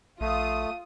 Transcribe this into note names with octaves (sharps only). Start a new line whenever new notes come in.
A#1 A3 F4 D#6